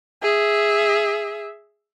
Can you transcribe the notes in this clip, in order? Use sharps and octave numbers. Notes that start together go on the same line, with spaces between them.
G#4 E5